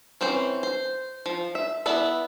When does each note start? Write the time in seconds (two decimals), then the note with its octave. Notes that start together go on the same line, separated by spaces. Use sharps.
0.21 E3 C4 C#4 C5
0.63 C5
1.26 F3
1.55 E5
1.86 B3 E4 D5 E5 B5